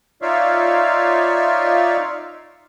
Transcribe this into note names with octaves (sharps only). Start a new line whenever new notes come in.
D#4 F4 C#5 D5 E5 F5